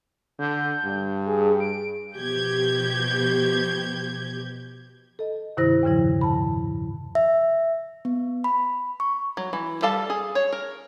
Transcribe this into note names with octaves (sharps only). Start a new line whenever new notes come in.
D3 G6
G2
G#4
D7
B2 F3 G4 G6 G#6
A4 D#5
G2 C3 D#3 E4 C5 A#6
E2 A2 C#3 F3 E4
A5 B5
E5
B3
B5
C#6
F#3
E3
G3 A4 F5 A5
G#4
C#5
A#4